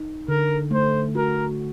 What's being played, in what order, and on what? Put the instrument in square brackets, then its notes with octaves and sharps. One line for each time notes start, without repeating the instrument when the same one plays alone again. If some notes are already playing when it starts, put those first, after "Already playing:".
Already playing: [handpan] D#4
[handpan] D3 [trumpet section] A#4
[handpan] A3 [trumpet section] C5
[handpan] F#4 [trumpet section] A#4